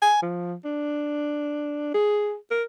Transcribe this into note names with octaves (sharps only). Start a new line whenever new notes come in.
G#5
F3
D4
G#4
A#4